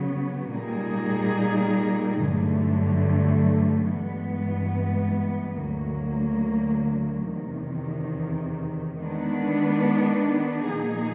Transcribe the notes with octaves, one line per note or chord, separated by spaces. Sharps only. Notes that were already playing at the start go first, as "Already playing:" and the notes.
Already playing: C#3 F#3 B3
A#2 G3 A#3 D#4 G#4
G2 D3 F#3 A3
G2 E3 G#3 B3
D2 D3 F#3 A#3
E2 C3 D#3
D#3 G#3 B3 D4
A#2 F3 A#3 D#4 G#4